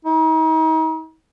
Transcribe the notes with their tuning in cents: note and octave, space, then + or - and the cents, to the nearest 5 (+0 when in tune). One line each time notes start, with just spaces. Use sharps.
D#4 +40